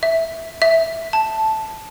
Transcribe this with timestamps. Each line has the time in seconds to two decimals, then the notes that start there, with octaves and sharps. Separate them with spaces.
0.03 E5
0.62 E5
1.13 A5